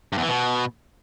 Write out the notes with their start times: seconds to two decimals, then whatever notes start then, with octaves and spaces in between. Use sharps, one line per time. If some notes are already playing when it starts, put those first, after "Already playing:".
0.13 G2
0.18 E2
0.23 E3
0.28 B2